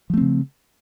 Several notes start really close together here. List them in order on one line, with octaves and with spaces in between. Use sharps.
F3 A3 C4 C#3